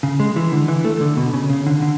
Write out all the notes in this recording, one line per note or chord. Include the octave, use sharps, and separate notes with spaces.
C#3
G#3
E3
D3
E3
A3
D3
B2
C#3
C#3
D3
D3